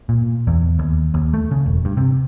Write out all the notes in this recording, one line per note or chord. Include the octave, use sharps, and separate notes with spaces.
A#2
E2
D#2
D#2
A3
C#3
E1
G2
C3